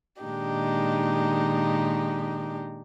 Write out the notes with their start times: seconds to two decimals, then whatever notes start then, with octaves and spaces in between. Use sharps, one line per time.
0.22 A#2 D#3 G#3 D4 D#4 G4